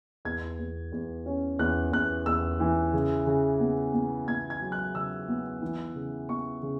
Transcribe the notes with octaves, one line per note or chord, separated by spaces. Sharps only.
E2 G#6
E2
E2
C#4
E2 F#6
E2 F#6
E2 E6
E3
C#3
C#3
B3
B3
B3 G#6
G#6
F#3
F#6
C#3 E6
B3
E3
C#3
B3 C#6
C#3